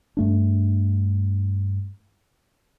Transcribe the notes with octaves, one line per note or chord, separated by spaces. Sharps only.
G2 A3 D4